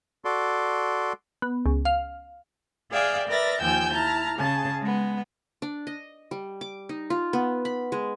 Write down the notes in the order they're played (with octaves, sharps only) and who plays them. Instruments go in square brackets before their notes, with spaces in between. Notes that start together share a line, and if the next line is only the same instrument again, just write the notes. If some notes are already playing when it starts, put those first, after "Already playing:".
[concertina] F#4 A4 D5 C6
[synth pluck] B3
C#2
F5
[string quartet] G#4 D5 E5 F5 G5
A#4 B4 D5 E5 A6 A#6
D#2 F3 G5 G#5 E6 G6
E4 A5 A#5 F6
C#3 G#4 A5
G#3 B3
[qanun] D4
D#5
G3
D6
D#4
F4
B3
B5
G#3